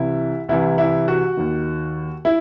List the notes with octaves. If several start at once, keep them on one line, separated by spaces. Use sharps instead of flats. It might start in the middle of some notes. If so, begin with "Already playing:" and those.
Already playing: C2 C3 E3 E4
C2 C3 E3 E4
E4
F#4
D#2 D#3
E4